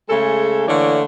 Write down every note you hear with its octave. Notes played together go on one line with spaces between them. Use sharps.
C#3 G#3 A3 A4
D3 E3 A3 A#3 C#5 D5